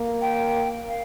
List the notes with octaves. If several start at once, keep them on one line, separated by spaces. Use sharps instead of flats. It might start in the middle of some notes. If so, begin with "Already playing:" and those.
Already playing: A#3
G5
F5